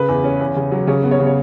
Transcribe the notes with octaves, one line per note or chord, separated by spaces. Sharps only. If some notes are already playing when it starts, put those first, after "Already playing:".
Already playing: C#3 B4
E2
C#4
E2
C#3
F#3
C#3 C#5
B3
C#5
C#3
C#5